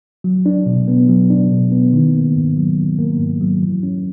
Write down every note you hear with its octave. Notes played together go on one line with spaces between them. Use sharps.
F#3
D4
B2
B3
F#3
D4
B2
B3
D#3
A#3
G#2
F#3
D#3
A#3
G#2
F#3
E3
C#4